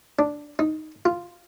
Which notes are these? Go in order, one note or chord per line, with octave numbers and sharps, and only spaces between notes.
D4
D#4
F4